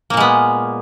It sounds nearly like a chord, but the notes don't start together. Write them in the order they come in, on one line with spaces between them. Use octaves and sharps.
A#3 A#2 G#3 B3